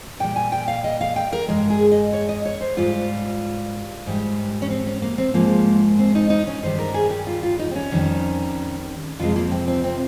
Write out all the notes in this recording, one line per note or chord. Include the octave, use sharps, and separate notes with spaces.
A#2 G3 G5
G#5
G5
F5
D#5
F5
G5
A#4
G2 F3 G#3 A#4
G#4
D#5
C#5
D#5
C#5
C5
G#2 G3 F4
G#2 G3
C#4
C4
C#4
A#3
C4
G#2 F3 G#3 A#3
C4
D#4
D#4
C#4
G2 D#3 G3 C5
A#4
G#4
G4
F4
F4
D#4
C4
C#4
F2 D#3 G3
F2 C3 F3 G#3 F4
A#3
A#3
C4
C4
C4